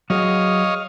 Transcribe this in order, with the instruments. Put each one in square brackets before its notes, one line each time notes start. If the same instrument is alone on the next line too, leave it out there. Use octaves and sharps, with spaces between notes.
[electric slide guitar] F#3 F#4 G#4 [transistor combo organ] C#5 D#5 F5